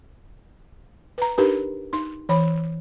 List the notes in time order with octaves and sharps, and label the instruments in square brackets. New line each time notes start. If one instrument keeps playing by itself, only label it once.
[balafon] B4 A#5
D4 D#4 G4 A#4 B4
D#4 C6
E3 C#5 B5